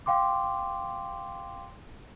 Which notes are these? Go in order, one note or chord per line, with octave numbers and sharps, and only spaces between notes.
F5 G5 C6 D6